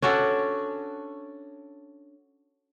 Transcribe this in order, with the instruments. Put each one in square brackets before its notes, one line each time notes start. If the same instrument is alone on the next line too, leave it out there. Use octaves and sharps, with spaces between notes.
[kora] C#4 D4 F#4 A4